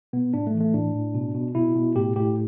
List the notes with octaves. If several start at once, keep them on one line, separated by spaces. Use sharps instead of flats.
B2 B3
A2 D4
A3
E3
A3
A2 D4
A2
B2
B2
B2 E4
B2
A2 G4
A2 G4